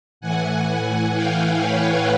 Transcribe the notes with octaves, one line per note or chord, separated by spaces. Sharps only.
A2 E3 F#5 G#5
F5 G5
B4 C#5